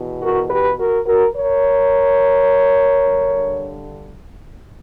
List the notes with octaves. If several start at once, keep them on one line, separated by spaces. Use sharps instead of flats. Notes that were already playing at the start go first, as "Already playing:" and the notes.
Already playing: E2 B2
F#4 A#4
G4 B4
F#4 A#4
F#4 A#4
A#4 C#5
G2 D3